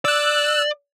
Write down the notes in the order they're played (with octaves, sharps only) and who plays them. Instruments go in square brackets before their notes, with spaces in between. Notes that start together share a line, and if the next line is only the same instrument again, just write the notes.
[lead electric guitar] D5 [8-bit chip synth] E6 F#6